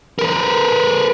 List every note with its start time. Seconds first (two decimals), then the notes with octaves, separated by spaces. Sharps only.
0.19 A#4 B4